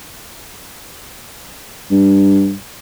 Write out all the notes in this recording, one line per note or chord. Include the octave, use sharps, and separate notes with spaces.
G2